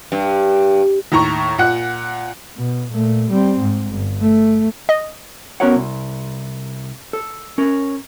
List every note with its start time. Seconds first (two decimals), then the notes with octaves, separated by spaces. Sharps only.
0.12 G2
1.12 D#2 A2 A#5 C#6
1.58 A#2 F#5 F#6
2.58 B2
2.91 A#2 A3
3.31 G3 C4
3.60 G#2
3.91 G1
4.21 A3
4.89 D#5
5.60 B3 C#4 F#4 A#4 C#5 F#5
5.75 C2
7.13 A4
7.58 C#4 A#4